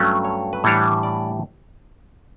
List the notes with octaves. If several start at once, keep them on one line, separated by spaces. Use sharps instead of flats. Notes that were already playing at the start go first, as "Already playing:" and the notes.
Already playing: G2 F#3 A3 C#4
C#5
B4
A2 E3 G3 D4 C#5
D5